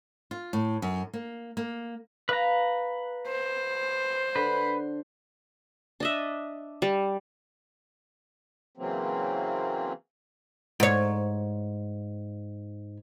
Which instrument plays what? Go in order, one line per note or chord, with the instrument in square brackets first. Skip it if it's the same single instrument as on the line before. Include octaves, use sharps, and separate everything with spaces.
[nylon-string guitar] F4
A2
F#2
A#3
A#3
[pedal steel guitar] B4 A#5 [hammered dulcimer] F5
[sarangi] C5
[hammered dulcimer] D3 [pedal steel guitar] B4
[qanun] D4 D#5 E5
G3
[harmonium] C#3 E3 F#3 A#3 C4
[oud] G#2 C#5